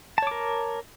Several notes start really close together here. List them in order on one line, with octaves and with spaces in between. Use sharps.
A5 C#5 D6 A#4